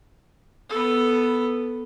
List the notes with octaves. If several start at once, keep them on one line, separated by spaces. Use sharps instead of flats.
B3 A4